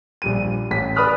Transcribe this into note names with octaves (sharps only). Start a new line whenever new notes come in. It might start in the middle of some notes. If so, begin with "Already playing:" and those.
A#1 G3 D#7
A1 B6
B4 D5 B5 D#6 F6 F#6